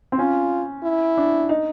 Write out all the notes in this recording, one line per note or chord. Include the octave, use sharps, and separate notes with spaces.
C4
C#4 F4
E4
D4
D#4